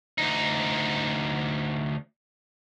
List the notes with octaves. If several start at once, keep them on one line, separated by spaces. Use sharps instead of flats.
D2 D#4